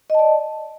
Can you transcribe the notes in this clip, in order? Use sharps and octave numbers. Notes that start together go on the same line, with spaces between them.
D5 D#5 A5